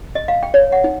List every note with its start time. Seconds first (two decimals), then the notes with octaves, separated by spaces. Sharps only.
0.15 D#5
0.28 F5
0.43 G5
0.54 C#5
0.72 F#5
0.84 D#4